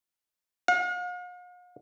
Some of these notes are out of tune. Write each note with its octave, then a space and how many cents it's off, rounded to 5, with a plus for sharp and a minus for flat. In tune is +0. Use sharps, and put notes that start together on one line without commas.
F5 +45